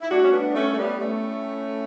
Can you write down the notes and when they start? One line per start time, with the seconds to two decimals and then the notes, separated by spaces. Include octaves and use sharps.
0.01 E4
0.10 A2 G3 D4 F#4
0.24 C#4
0.32 B3 D4
0.54 A3 C#4
0.73 A3
0.77 G3 B3
1.00 A3 C#4